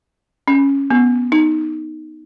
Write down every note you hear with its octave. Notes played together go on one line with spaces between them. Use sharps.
C#4
B3
D#4